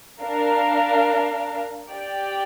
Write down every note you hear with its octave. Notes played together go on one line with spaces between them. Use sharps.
D4 A#4 F5
G4 D5 G5